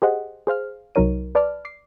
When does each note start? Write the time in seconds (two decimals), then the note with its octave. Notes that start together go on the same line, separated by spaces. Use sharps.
0.02 G4 G#4 C5 D#5 F#5
0.47 G#4 C5 F5 F6
0.95 C2 F#3 D#4 A#4 C#5 D#7
1.35 B4 D5 A5 D6 F6
1.65 D6 C7